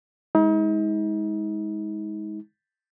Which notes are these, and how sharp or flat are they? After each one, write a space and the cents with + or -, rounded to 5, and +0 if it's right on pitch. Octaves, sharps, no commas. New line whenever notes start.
G#3 +0 D#4 +40